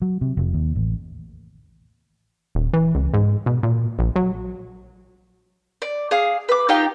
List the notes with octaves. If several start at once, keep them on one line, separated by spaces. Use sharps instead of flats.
F#3
C3
F1
D#2
A1
D#1
E3
C#2
G#2
B2
A#2
A#1
F#3
D5
G#4 F5
B4 D6
D#4 F4 G4 G5